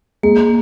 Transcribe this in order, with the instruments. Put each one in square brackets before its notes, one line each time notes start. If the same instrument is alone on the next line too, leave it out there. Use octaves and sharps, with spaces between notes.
[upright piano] G#3 [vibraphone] A#3